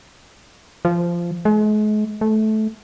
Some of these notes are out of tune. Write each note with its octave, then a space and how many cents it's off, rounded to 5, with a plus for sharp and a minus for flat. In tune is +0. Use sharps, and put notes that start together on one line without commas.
F3 -15
G#3 +40
A3 -20